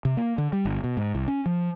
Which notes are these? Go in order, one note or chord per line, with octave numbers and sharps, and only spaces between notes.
C3
A#3
D3
G3
G1
B2
G#2
C2
C#4
F3